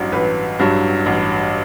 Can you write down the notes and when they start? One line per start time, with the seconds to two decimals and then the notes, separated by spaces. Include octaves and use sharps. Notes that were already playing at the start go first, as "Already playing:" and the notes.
Already playing: A1 G2 F#3
0.12 A1 B4
0.59 G2 F#3
1.06 A1